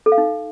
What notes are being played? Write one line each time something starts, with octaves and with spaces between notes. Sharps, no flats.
A4
F5
D#4